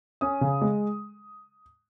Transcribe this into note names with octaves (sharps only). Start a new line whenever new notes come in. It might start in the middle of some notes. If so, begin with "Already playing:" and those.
C#4 D#6
C#3
G#3